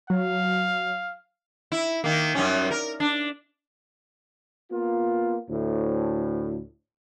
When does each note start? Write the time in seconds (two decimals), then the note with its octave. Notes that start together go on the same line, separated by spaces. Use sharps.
0.10 F#3 F5
1.72 E4
2.04 D#3 A#3
2.35 F#2 G3 C#4
2.71 A#4
3.00 D4
4.71 A#3 B3 F4
5.50 D2 A2